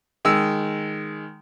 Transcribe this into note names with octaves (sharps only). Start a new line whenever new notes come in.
D#3 G#3 E6